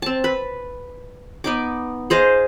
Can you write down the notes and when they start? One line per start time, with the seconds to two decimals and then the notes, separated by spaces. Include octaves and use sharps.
0.02 C4 A5
0.24 B4
1.44 B3 D#4 D6
2.10 G#4 C5 D#5 F5